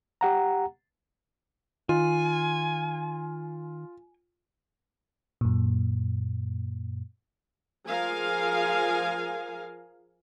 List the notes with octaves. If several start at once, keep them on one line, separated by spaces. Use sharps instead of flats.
G4 F#5 A#5
D#3 F4 G#5
F#2 A#2
F3 G#4 A#4 F5 G#5